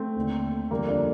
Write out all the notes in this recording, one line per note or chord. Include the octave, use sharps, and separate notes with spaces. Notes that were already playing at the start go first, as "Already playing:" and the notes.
Already playing: A3 C4
D#2 D3
F2 D3 G3 A#3
A#3 D4